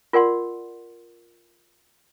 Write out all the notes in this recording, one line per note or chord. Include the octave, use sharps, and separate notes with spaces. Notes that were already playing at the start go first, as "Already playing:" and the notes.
F4 A#4 D5 F#5 C6